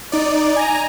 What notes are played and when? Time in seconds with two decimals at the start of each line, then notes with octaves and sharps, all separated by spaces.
0.12 D#4 D5
0.56 G#5 A#5